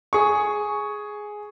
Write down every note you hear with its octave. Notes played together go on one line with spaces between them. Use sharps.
G#4 C#6